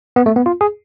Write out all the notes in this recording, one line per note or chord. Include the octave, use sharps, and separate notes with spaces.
B3
A3
B3
F4
G#4